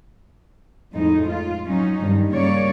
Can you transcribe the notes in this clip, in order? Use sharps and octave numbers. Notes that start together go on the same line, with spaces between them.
F2 A2 G#3 D#4
F4
F#3 C#4 D#4
G2 D#3 G3
C#3 G3 A#3 C#5 D5